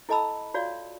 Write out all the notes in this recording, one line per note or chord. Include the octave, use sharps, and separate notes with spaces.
E4 A4 D#5 A5 B5 E6
F4 F#4 C#5 D5 F5